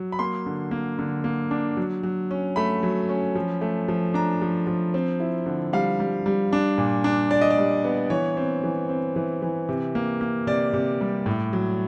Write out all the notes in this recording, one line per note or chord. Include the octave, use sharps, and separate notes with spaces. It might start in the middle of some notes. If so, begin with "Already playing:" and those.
Already playing: F#3
B5
A#3 C6
D3
A#3
D3
A#3
D4
F#3
F#3
C#4
A3 B5
F#3
C#4
F3
A3
F3
D4 A#5
F3
F3
C4
E4
D3
G3 F5
G3
G3
D4
A#2
D4
D4 D5
D#5
D5
G3
B3
E3 C#5
C4
E3
C4
E3
E3
C3
A#3
A#3
C3 D5
C3
G3
A2
F#3